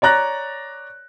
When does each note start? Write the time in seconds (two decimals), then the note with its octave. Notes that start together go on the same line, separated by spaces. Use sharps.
0.02 C#5 D5 A#5 F#6 A#6